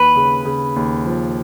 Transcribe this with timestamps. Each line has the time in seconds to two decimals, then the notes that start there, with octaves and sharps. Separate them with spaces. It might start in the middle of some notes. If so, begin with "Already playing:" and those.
Already playing: D#2 B4
0.16 C#3
0.45 C#3
0.76 D#2
1.05 F3